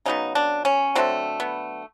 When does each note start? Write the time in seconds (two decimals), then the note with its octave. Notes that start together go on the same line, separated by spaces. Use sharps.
0.06 C#3 F#3 B3 D#4
0.35 D4
0.65 C#4
0.95 D3 F#3 A3 C4
1.40 B3